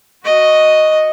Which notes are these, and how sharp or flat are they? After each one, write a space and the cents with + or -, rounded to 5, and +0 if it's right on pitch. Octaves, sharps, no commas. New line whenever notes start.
F#4 +0 D#5 +0